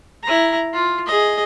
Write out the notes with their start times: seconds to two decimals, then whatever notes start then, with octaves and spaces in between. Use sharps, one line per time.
0.23 E4 A#5
0.73 F4
1.06 G#4 D#5